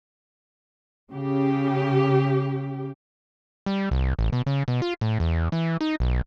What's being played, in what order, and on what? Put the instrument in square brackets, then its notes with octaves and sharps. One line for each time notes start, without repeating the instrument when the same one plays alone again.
[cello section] C#3 G4
[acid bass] G3
C2
A1
B2
C#3
B2
F4
A2
E2
E3
D#4
B1